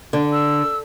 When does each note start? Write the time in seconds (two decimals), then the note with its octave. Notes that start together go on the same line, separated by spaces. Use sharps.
0.13 D3
0.32 E6